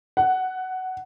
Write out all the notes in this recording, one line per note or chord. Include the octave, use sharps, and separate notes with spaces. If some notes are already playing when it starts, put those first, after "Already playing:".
F#5